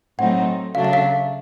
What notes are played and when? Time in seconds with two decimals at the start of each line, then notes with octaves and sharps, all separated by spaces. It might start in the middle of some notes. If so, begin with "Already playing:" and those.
0.18 A2 F#3 A3 C4 D#4 F#5
0.75 C#3 F#3 A3 D4 F5
0.84 E5
0.93 F5